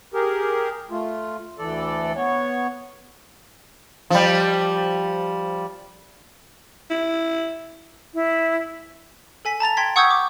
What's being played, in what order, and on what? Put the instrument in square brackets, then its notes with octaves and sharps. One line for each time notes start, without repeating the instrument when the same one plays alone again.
[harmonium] G4 G#4 A#4
A3 F4
D2 E3 A4 D5
B3 C#5
[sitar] F3 G3
[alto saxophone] E4
[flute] E4
[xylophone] A4 G#5 B6
A5 A#5 A6 F7
G5 C6 G#6 B6
F#5 C#6 D#6 E6 G6 G#6
D6